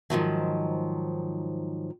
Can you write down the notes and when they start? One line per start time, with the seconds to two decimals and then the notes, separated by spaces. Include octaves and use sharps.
0.10 G#2 D#3 F3 F#3